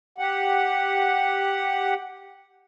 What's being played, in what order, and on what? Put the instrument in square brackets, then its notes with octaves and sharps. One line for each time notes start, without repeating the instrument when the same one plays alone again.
[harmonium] G4 F#5